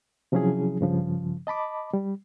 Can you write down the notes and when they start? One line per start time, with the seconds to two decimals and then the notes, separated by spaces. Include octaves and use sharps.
0.32 C3 F3 F#3 C#4 E4 G#4
0.81 G2 C#3 F3
1.47 D#5 A5 B5 D6
1.93 G3